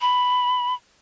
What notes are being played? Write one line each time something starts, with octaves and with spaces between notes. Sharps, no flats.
B5